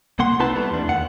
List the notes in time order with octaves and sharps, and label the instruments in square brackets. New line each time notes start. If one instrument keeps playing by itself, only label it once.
[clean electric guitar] C2 A#3 F#5 C6
C4 D#4 E4 B4 A5 C6
G3 A3 B3
E2 D4
D#2 F#5